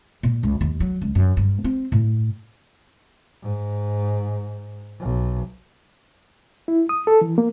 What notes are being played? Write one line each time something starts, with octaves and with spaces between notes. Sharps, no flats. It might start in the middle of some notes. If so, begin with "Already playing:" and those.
A#2
C#2
D#2
F#3
C#2
F#2
G2
C4
A2
G#2
B1
E4
D#6
A4
E3
A#3